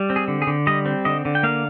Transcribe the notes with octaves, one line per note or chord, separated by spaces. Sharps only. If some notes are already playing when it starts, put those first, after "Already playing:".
Already playing: G3
C4
G#4
D3
G#4
D3
G3 D#5
C4
D3 D#5
D3
G5
A#3 F5